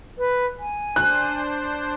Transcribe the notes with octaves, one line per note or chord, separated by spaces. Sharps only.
B4
G#5
D4 C5 F#6